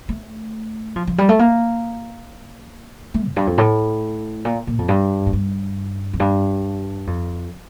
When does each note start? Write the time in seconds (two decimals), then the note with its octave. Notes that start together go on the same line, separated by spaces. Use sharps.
0.09 A3
0.96 F3
1.07 F3
1.18 G3
1.29 A3
1.39 A#3
3.14 A3
3.29 F2
3.36 G2
3.47 F2
3.58 A2
4.45 A#2
4.67 A#2
4.78 F2
4.88 G2
5.26 A2
5.33 G2
6.13 F2
6.20 G2
7.07 F2